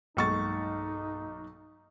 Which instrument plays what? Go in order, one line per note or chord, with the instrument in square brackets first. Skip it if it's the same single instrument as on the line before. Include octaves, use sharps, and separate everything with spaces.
[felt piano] B1 C#6 A6 [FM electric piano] G2 G#3 A#3 [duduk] D#4